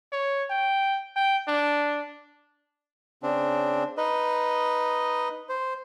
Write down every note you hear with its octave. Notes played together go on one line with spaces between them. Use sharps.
C#5
G5
G5
D4
C#3 C4 D4
D#4 B4 D#5
C5